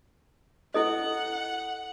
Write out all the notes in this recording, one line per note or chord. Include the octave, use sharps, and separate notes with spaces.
E4 A4 D#5 F#5